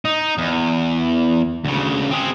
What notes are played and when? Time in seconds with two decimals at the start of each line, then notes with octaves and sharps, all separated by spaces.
0.05 D#4
0.38 E2
1.65 D2 C#3
2.11 C4 G#4